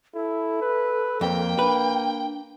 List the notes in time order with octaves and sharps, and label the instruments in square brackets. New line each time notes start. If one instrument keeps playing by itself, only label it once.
[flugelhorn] E4 [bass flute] A4
[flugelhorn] B4
[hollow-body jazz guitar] F2 [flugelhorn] A#3 [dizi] G5
[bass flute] D4 [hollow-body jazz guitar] B4